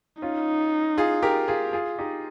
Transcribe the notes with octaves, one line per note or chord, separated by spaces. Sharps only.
C#4 D#4 F4
F4 G#4
G4 A#4
F4 G#4
F4 G#4
D#4 G4